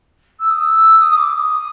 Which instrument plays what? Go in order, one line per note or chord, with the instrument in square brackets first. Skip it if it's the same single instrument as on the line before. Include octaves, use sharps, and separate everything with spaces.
[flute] E6
D#6
E6
D#6
D#6
D6
D#6